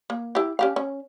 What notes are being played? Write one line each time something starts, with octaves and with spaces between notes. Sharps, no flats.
A#3
E4 G4
C#4 G4 F5
C#4